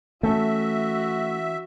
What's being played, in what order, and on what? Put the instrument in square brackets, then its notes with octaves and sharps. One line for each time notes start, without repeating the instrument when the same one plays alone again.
[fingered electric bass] E3 C#4 [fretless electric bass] A3 [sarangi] F#4 [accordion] E5